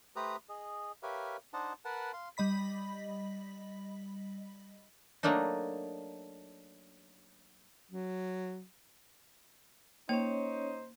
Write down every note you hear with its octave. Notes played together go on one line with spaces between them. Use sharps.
A3 G4 B4 C5 A#5 D#6
G#4 D#5
G4 A#4 B4 C#5 E5 F5
D4 D#4 C5 D#5 F#5 A5
A#4 B4 F#5 A5
F5 C6
G3 D#5 B5 B6
F#3 A3 A#3 D4 D#4
F#3
A#3 C#4 D#4 C5 C#5